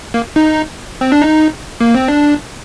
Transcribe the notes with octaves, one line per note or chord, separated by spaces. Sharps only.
A#3
D#4
C4
D4
D#4
A#3
C4
D4